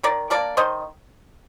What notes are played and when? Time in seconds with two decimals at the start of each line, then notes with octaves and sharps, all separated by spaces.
0.03 D#3 A#4 D5
0.30 A#3 D4 A#4 D5
0.57 D#3 C5 D#5